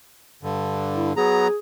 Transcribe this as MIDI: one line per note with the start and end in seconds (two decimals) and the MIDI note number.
0.43 1.13 43
0.43 1.13 50
0.95 1.11 64
1.17 1.48 54
1.17 1.48 59
1.17 1.57 68
1.17 1.48 82